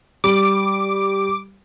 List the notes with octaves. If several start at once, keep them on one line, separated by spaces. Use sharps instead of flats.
G3 D6